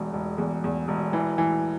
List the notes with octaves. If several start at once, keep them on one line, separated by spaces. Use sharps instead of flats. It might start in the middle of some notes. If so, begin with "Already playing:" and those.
Already playing: E1 E2
E1
E2
E2
E1
E3
E3